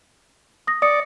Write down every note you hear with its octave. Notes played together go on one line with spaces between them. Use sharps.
D#6 A#6
D5 D#6 C#7